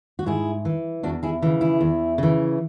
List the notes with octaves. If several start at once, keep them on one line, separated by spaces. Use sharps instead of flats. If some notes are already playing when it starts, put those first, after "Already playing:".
F#4
G#2 E4 G#4
E3
E2 D4 F#4
E4 G#4
C#3 E3
E4 G#4
E2
C#3 E3